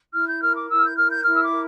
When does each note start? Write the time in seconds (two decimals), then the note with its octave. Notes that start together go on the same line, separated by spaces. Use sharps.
0.14 E4 F6
0.28 G6
0.41 A#4 F6
0.55 D6
0.69 E4 E6
0.78 F6
0.83 G6
0.96 A#4 F6
1.10 G6
1.24 E4 F6
1.35 E6
1.42 D6
1.51 A#4